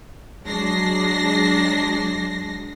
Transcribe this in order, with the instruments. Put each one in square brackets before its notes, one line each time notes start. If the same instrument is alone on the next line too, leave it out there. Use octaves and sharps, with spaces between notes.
[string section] F#3 G#3 D4 A#6 C7